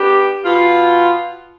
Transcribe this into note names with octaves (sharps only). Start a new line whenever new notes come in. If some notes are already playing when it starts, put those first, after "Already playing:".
Already playing: B3 D4 G4
B2 B3 F4